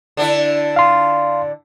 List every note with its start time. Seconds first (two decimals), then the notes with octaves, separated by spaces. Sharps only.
0.17 D3 D4 E4
0.76 F5 C6